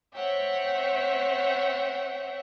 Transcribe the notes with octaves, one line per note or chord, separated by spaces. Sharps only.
C4 C#5 E5 F#5 G5